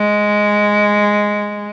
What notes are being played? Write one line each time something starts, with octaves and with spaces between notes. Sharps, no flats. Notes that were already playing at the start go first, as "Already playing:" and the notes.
Already playing: G#3